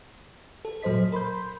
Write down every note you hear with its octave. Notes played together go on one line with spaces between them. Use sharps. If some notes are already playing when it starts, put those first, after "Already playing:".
A4
A#2 F#3 A4 C5 D#5 B6
A#4 B5 C6 G6